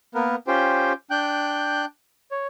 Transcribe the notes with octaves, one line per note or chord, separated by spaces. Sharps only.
A#3 B3 A#4 B4
C#4 F4 G4 C5 G5
D4 G5 F#6 G6
C#5